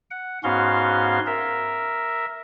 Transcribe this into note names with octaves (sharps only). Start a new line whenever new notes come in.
F#5
G#2 B3 C#4 F#4 F5 C6
A#4 E5